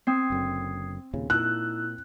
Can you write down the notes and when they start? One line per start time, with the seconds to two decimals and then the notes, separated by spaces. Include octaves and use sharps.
0.07 C4 D#6 G#6 C7
0.30 F#1 F#2 D3
1.13 D#2 A#2 C#3
1.30 A#2 D#4 E4 E6 F#6